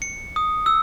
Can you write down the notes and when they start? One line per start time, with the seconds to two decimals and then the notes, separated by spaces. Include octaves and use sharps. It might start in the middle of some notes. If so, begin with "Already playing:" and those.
0.02 C#7
0.36 D#6
0.66 E6